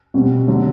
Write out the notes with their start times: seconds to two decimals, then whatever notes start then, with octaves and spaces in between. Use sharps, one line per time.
0.14 B2 G3 C4
0.48 D3 F#3